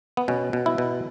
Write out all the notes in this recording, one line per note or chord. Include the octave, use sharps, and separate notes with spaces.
B3
B2 C#4
B2
E4
B2